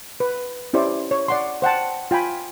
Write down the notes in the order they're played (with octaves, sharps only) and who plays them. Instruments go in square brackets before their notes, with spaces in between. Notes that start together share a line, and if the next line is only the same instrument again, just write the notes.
[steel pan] B4
C#4 E4 G4 C5 D5
C#5
D5 F#5 C6
C5 F#5 G5 A5
F4 G5 G#5 B5